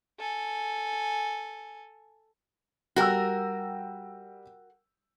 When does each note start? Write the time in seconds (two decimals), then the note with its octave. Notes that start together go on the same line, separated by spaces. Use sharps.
0.19 A4 G#5
2.96 G3 F#4 A#4 G5 E6